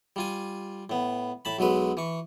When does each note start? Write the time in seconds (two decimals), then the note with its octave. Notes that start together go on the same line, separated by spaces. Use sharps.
0.16 G3 F4 G#5
0.90 A2 B3
1.45 A2 A5 B5
1.59 B1 F#3 G#3 B4
1.97 E3 C#6